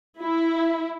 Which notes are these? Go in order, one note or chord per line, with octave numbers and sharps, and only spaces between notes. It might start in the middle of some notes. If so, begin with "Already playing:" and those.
E4